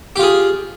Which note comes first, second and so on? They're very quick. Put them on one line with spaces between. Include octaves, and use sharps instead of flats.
G4 F4 G#4